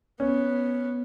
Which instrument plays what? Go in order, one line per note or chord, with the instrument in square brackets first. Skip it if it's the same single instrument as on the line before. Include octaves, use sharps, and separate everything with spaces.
[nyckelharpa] B3 [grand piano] C#4